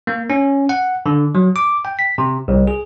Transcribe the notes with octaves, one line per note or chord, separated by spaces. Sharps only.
A#3
C#4
F#5
D3
F#3
D6
G5
B6
C3
C2
G#4